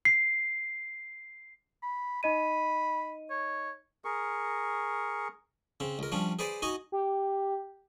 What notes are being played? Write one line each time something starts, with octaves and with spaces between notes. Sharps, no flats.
C7
B5
D#4 D#5 B5 D#7
C#5
G#4 A#4 C#6
C#3 C4
C#2 A#4
F3 G3 C#4 D4
G#4 B4 C5 D5 G#5
D#4 F#4 D#5 G#5 A#5
G4